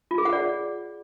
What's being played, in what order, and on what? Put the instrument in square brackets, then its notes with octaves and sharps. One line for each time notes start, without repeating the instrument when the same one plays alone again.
[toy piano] F4
G#4
F#5
D5